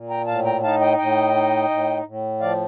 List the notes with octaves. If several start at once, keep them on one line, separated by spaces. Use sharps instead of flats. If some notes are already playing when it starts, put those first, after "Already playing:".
Already playing: A#2
G5 A#5
A2 F5 A5
G5 A#5
D#4 F5 A5
D#5 G5
A2 D#5 G5
D#4
A2
A2
F3 D5 F5